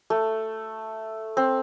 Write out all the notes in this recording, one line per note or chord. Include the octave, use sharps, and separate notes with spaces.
A3
C4